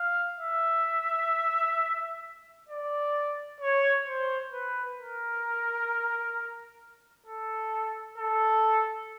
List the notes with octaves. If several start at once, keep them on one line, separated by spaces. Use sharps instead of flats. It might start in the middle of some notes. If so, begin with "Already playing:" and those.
Already playing: F5
E5
D5
C#5
C5
B4
A#4
A4
A4